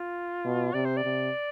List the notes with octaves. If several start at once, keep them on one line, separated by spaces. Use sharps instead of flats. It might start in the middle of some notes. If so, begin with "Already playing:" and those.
Already playing: F4
B2
C3 D5
C5
D5
C3